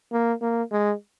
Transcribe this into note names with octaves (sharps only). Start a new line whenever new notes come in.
A#3
A#3
G#3